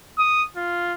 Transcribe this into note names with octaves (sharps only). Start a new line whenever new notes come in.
D#6
F4